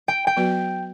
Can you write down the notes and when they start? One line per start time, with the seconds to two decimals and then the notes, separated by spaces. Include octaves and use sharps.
0.08 G5
0.27 G5
0.37 F#3 B3 F#4 B4